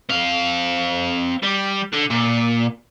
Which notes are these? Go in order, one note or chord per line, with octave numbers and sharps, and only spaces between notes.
C4 F5
G3
D3
A#2